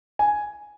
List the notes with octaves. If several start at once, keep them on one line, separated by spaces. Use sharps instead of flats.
G#5